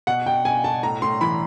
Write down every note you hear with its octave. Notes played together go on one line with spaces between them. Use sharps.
B2 F#5
B2 G5
B2 G#5
B2 A5
A2 A#5
A2 C6
E3 B5